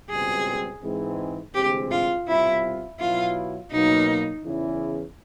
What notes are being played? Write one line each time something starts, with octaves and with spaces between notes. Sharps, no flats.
C#2 B2 G3 C4 G#4
G#2 E3 G#3 C4
D2 C3 E3 G#3 C4 G4
F4
C2 B2 G3 C4 E4 F4
B2 F#3 B3 E4 F4
B2 F#3 A#3 D#4
E2 C#3 E3